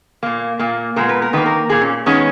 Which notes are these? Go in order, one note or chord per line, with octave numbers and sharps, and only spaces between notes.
A#2 A#3
A#2 A#3
A#2 G#3 B3 A#4
B4
A#4
D#3 A#3 B4
A#4
A#2 A#3 G#4
C#4
D#3 G#3 B3 C#4